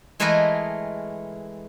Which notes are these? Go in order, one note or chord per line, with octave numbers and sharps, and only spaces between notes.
E3 G#3 A3 A#4 B4 D#5